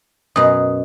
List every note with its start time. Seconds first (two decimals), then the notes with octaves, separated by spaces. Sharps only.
0.36 F#2 B2 D#6